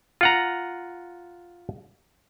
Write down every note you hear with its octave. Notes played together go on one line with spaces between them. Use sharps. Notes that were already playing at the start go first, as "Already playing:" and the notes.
F4 F#5 A#5